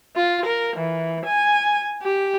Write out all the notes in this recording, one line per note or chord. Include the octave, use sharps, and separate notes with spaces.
F4
A#4
E3
G#5
G4